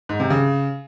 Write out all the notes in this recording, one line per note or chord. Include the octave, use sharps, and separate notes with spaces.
G#2
C3
C#3